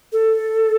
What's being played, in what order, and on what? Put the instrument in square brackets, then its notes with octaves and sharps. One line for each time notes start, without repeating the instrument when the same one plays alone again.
[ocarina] A4